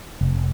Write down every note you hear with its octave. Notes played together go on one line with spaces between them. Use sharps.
F1